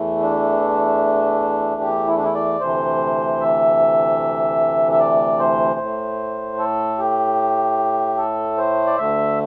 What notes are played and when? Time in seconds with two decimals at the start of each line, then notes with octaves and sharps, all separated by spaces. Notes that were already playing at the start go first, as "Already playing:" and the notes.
Already playing: E2 E3 A3
0.22 D4
1.81 G4
2.07 E4
2.16 D4
2.24 E4
2.34 D5
2.60 D2 C3 E3 A3 C5
3.40 E5
4.92 E5
4.99 D5
5.39 C5
5.79 A2 A3
6.59 A4
6.98 G4
8.17 A4
8.58 C5
8.86 D5
8.97 D2 D3 A3 E5